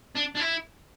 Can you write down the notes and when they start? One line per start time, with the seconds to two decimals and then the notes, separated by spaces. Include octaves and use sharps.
0.15 D4
0.35 D4
0.40 E4